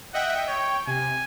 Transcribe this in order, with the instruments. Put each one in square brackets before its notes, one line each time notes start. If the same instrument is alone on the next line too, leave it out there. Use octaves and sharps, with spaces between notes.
[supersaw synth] D#5 E5 G5 [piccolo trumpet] F#5
[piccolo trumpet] C#5 [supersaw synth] G5
[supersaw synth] C3 [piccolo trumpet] G#5